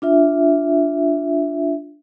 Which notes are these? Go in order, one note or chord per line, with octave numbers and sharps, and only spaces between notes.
D4 F4 E5